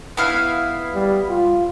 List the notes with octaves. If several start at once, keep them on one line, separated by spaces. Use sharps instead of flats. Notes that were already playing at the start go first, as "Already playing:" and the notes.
B3 E4 F5
G3
F4